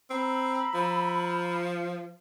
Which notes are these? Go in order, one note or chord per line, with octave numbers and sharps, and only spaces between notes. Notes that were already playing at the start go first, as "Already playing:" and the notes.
C4 A#5 B5 E6
F3